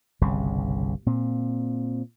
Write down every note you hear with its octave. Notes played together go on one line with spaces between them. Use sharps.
G1 C2 C#3
A#2 C4